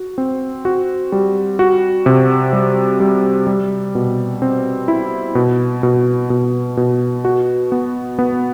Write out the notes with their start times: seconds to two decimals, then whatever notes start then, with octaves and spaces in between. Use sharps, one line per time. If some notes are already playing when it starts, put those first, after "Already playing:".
Already playing: F#4
0.18 C4
0.65 F#4
1.12 G3
1.59 F#4
2.06 C3
2.53 G3
3.00 G3
3.47 G3
3.95 B2
4.42 C4
4.88 E4
5.35 B2
5.83 B2
6.30 B2
6.77 B2
7.25 F#4
7.72 B3
8.19 B3